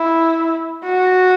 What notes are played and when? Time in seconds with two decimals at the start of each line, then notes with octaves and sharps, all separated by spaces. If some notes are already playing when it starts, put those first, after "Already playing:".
Already playing: E4
0.86 F#4